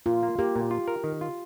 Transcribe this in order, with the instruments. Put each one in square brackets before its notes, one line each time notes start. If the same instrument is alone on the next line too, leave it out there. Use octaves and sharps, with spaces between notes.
[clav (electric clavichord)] A#2 [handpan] F4
[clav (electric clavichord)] A#3
[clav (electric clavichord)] A#3 [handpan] G4
[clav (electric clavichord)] A#2
F4
A#4
D#3
F4